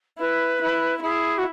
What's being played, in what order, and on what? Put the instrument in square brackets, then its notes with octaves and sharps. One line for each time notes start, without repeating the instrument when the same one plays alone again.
[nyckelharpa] E4 [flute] B4
[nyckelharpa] E4
[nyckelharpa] E4 [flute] G#4
[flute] F#4